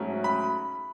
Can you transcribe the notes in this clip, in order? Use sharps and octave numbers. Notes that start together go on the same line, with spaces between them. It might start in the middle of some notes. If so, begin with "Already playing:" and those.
Already playing: G#2 F#3 A3 C#4
B5